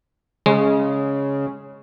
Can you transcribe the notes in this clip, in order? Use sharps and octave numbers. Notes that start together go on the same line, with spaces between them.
C#3 G#3